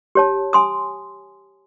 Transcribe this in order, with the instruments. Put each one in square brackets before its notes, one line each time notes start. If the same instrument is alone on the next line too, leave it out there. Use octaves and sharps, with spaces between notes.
[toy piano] G4 C#5 A5
G#5 C6 D#6